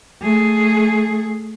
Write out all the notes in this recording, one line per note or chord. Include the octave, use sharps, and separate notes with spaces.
A3 G#4